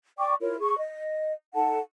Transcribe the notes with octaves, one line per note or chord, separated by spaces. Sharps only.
D5 G5 C#6 D6
E4 F4 A#4 C#5
G#4 C#6
D#5
D#4 A4 F#5 A5